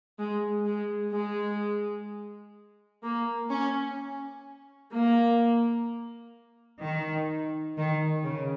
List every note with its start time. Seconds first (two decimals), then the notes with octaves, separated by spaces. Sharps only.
0.19 G#3
0.65 G#3
1.13 G#3
3.03 A#3
3.50 C#4
4.93 A#3
6.82 D#3
7.77 D#3
8.24 C#3